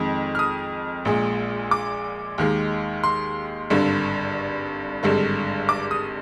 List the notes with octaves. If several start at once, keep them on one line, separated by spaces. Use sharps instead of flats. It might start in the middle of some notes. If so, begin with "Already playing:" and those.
Already playing: F2 D#3 G#3
F6
D#6
A#1 A#2 G#3
D6
D#2 D#3 G#3
C6
G#1 G2 D3
G#1 G2 D3 G#3
D6
D#6